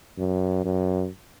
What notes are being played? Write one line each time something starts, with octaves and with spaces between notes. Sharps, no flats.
F#2
F#2